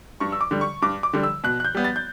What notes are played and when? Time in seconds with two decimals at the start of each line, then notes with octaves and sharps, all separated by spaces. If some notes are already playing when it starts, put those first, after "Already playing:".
0.20 G2 C#6
0.32 E6
0.41 D6
0.51 D3 G3
0.61 C#6
0.82 G2 D6
1.03 D6
1.13 D3 G3
1.23 E6
1.44 B2 F#6
1.60 F#6
1.65 G6
1.75 G3 B3
1.84 A6
1.96 G6